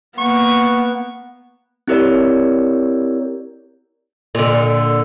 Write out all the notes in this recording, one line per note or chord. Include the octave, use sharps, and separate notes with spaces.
A#3 B3 C#6
C4 E4 G4 A#4 C#5 D5
A#2 D3